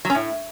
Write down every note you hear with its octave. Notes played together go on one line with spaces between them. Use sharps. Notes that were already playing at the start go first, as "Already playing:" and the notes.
F#3
C#4
A2